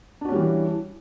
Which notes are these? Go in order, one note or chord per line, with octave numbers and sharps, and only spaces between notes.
E3 G3 C#4 D4 F#4